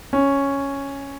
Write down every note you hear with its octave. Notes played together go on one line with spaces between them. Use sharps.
C#4